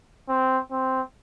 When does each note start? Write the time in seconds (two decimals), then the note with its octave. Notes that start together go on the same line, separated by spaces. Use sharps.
0.29 C4
0.71 C4